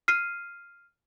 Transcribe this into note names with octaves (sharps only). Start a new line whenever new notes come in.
F6 C7 D#7